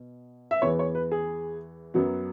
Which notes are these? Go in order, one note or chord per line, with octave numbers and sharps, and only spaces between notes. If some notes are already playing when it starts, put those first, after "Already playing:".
Already playing: B2
E5
E2 E3 B3 C#5
C#5
B4
G#4
F#2 F#3 B3